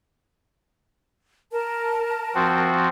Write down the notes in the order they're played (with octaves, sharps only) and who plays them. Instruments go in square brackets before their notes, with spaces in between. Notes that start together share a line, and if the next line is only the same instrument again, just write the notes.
[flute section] A#4 A5
[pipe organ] F3 C4 F#4